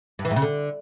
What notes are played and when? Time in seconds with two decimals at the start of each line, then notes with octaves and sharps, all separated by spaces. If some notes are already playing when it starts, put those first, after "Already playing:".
0.19 G2
0.25 E3
0.31 G#2
0.36 C#3
0.42 D3